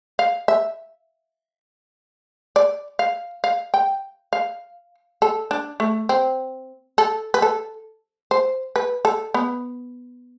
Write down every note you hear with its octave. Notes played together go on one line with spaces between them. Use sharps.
F5
E5
D5
F5
F5
G5
F5
A4
D4
A3
C4
A4
B4
A4
C5
B4
A4
B3